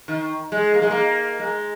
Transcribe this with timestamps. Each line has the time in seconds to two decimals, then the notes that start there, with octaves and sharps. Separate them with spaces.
0.08 D#3
0.52 G#3
0.74 A#3
0.82 G#3
0.91 A#3
1.39 G#3